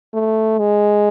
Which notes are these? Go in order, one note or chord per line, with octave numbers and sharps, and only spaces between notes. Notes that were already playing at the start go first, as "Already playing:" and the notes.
A3
G#3